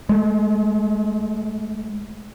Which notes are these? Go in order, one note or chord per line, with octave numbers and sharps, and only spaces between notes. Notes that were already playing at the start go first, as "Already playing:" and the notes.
G#3 A3